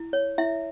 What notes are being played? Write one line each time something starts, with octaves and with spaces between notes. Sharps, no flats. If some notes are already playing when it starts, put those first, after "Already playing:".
Already playing: E4
C#5
E4 E5